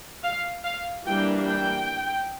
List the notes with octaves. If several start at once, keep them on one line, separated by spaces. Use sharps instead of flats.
F5
F5
E3 G3 A#3 D4 G5
G5